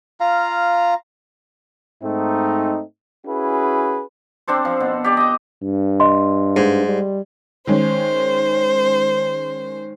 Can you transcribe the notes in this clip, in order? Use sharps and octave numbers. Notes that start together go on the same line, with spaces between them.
F4 F5 A#5
G#2 A3 C4 D#4
C#4 E4 F#4 G#4 B4
C4 D4 A4 C5
F3
B2
G4 D5
D#5 G5
G2
D#5 C6
G#2
G3
D#3 G#3 C#4 C5